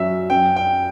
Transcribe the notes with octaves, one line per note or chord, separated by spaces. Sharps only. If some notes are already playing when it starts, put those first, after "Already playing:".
Already playing: F#2 F#3 E5
F#2 G5
G5